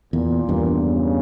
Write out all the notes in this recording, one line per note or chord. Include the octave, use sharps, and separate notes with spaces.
E2 A#2
E2 G2
C#3